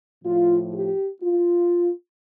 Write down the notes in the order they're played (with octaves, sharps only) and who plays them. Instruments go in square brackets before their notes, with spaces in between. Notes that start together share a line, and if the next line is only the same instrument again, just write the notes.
[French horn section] A2 F3 F4
G4
F4